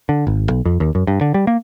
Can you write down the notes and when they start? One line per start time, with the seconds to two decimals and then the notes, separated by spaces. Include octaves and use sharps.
0.09 D3
0.27 G#1
0.50 B1
0.65 F2
0.80 D#2
0.95 F#2
1.07 G2
1.21 D3
1.34 G3
1.47 A#3